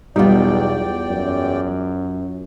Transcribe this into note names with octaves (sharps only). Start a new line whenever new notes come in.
B1 E2 G3 B3 D#4 F4 D5 G5
F#2